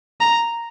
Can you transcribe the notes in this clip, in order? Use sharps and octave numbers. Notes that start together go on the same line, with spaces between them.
A#5